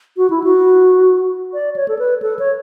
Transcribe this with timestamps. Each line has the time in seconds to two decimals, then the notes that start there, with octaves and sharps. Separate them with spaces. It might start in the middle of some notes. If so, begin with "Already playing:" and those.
0.17 F#4
0.30 E4
0.44 F#4
1.54 D5
1.76 C#5
1.88 A4
1.99 B4
2.22 A4
2.39 C#5